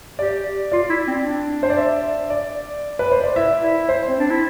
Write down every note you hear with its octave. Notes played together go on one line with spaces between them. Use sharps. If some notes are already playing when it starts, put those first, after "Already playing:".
G4 D5
F4 D5
E4
C4
D4
C5
D5
E5
D5
B4
C5
D5
E4 E5
E4
C5
C4
D4
E4